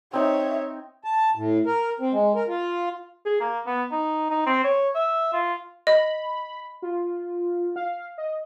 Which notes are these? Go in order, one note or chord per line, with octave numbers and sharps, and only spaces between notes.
C4 D#4 C#5 E5
A5
A2
A#4
C4
G#3
A#4
F4
G#4
A#3
B3
D#4
D#4
C4
C#5
E5
F4
D#5 B5
F4
F5
D#5